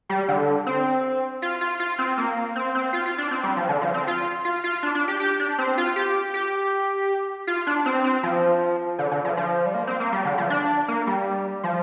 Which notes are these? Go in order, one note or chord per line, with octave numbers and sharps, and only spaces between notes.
G3
D3
C4
F4
F4
F4
C4
A#3
C4
C4
F4
F4
D4
C4
G3
F3
D3
F3
C4
F4
F4
F4
D4
D4
G4
G4
D4
C4
F4
G4
G4
F4
D4
C4
C4
F3
D3
D3
F3
F3
G3
A#3
C4
A#3
G3
D3
F3
D4
A#3
G3
F3